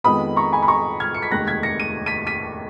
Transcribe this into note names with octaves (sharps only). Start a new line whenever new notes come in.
F2 D#3 G#3 B3 B5 D#6
A#5 C#6
G#5 B5
B5
A#5 C#6
F6 G#6
C#7
B6
F1 D#2 D#3 G#3 F#6 A#6
G#6 B6
A#6 C#7
D#7
B6 D#7
B6 D#7